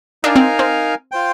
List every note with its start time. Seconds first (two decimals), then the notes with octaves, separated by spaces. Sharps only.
0.24 D4 D#4 A#4 F5 G#5
0.36 C4
0.59 C4
1.12 F4 C5 G5